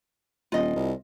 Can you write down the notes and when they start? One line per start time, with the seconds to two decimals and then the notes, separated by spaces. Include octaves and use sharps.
0.52 D#1 F4 D#5
0.76 C2